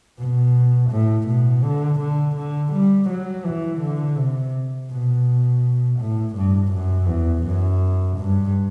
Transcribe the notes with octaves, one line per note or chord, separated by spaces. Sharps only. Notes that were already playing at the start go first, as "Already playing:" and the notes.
B2
A2
B2
D3
D3
D3
G3
F#3
E3
D3
C3
B2
A2
G2
F#2
E2
F#2
G2